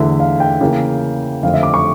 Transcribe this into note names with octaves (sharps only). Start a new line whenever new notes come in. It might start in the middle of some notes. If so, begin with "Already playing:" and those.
Already playing: E2 D3 A3 E5
F5
G5
C#3 E3 A#3
F2 D3 A3 F5
E5
D6
C#6